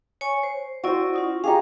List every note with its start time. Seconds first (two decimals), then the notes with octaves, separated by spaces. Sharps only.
0.21 C#5 G#5 C#6
0.43 C5
0.84 E4 F#4 C5 D5 D#5
1.14 C#4 F4 D#6
1.44 D#4 G4 G#4 F5